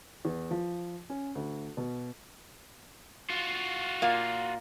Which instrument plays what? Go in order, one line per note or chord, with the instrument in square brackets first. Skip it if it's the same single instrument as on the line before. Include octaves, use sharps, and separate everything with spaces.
[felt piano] E2
F3
C#4
D2
B2
[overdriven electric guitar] F4 F#4
[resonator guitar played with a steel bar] A#2 F5